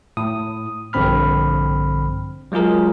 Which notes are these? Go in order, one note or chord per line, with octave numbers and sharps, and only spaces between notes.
A2 D#6
A#1 G2 D3 C4 B5 F6
F#3 G#3 F4 G#4 A#4